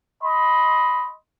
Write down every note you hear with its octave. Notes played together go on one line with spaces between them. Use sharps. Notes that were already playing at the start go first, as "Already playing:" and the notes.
D#5 B5 C6